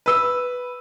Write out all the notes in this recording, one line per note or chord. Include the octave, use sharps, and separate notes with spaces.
B4 E6